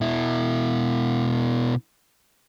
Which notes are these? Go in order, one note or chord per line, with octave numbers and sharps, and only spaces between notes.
B2 E4